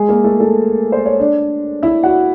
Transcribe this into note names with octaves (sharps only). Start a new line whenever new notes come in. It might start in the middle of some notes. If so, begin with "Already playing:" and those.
Already playing: G#3 G#4
A#3 A#4
A3 A4
A3 A4
C5
C#5
D4 D5
E4 E5
F#4 F#5